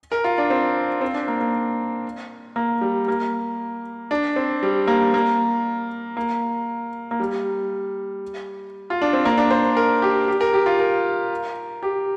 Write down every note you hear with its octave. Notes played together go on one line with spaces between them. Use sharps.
A#4
F4
D4
C4
C4
D4
A#3
A#3
A#3
G3
A#3
D4
C4
G3
A#3
A#3
A#3
A#3
G3
F4
D4
C4
A#3
D4
C5
A#4
G4
G4
A#4
G4
F4
A#4
G4